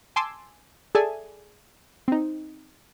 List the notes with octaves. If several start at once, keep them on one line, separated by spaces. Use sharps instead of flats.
G#5 A5 C6 D6 E6
G#4 A4 D5 E5 G#5 A5
C4 D#4